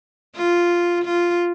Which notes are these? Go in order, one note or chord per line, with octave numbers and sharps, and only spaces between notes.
F4
F4